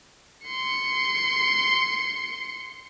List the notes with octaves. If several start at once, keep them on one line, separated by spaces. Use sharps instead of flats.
C6 C#7